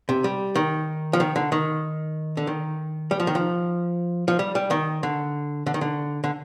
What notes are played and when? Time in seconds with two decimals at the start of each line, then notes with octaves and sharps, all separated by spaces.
0.09 C3
0.24 G3
0.55 D#3
1.13 F3
1.20 D#3
1.36 D3
1.52 D#3
2.37 D3
2.47 D#3
3.11 G3
3.20 F3
3.27 D#3
3.35 F3
4.28 F3
4.39 G3
4.55 G3
4.71 D#3
5.03 D3
5.66 D3
5.74 D#3
5.81 D3
6.24 D3